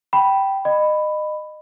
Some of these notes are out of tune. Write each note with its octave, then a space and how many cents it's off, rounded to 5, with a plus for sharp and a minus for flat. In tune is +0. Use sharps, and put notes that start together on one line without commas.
G5 -10 B5 -5
D#5 -30 B5 +10